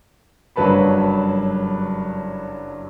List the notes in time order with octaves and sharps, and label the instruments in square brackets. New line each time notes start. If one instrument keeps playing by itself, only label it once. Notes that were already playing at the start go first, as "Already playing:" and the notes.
[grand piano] F#1 G2 F#3 B4 A5 B5